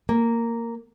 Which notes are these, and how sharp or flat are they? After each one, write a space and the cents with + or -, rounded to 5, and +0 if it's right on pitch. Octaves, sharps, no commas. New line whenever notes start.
A#3 -10